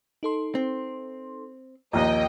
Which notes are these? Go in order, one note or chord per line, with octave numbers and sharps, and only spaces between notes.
D#4 A4 C6
C4
A#1 D#2 D#5 G5 A#5